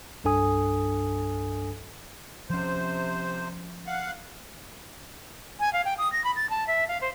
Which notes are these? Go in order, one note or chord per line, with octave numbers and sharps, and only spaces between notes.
C2 G2 D4 A4 G#5 D#6
C3 F3 C#4 C5
F5 F#5
G#5
F5
G5
D#6
A#6
B5
A6
A5
E5
F5
C5